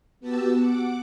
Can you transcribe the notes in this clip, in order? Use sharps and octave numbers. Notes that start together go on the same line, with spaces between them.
B3 F#4 G4 A5 E6
F#5 D6